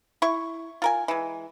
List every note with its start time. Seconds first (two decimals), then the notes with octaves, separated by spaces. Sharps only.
0.22 E4 C#6
0.82 F4 A#4 G#5
1.08 E3 G#3